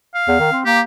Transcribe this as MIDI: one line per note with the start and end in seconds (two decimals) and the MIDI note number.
0.15 0.60 77
0.28 0.35 40
0.39 0.52 51
0.52 0.63 60
0.65 0.82 58
0.65 0.80 67